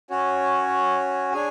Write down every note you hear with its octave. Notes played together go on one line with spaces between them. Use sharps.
C#4 F#4 C#5
D4 G#4 C#5 G#5